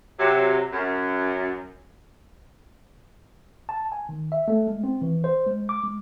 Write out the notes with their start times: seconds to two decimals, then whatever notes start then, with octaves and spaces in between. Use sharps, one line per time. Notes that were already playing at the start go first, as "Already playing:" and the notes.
0.19 C3 F#3
0.72 F#2
3.69 A5
3.92 G#5
4.09 D#3
4.32 E5
4.48 A3
4.67 G#3
4.84 C4
5.01 E3
5.24 C5
5.46 G#3
5.69 D6
5.84 G#3